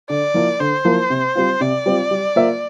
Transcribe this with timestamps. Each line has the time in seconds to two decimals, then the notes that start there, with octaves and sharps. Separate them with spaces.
0.09 D3 D5
0.34 F3 A#3 E4 A#4
0.59 D3 C5
0.85 F3 A#3 E4 A#4
1.10 C3
1.35 G3 C4 F4
1.60 C3 D5
1.86 G3 C4 F4
2.11 G3
2.36 A#3 F4 C5 E5